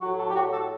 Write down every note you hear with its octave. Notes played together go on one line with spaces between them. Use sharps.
A2 F#3 F#4
A4
G4
A2 F#3 F#4
A4